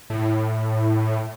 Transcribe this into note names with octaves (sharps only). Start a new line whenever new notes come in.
A2